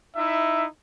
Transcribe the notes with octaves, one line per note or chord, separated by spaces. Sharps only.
D#4 E4 E5